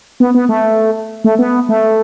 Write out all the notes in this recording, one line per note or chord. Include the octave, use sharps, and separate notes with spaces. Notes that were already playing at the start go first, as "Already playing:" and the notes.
B3
B3
A3
A3
B3
A3